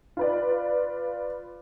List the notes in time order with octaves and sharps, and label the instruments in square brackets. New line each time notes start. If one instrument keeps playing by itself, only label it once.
[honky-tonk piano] F4 B4 D5